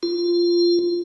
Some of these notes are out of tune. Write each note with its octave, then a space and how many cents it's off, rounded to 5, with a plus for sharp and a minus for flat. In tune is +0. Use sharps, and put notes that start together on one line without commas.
F4 -10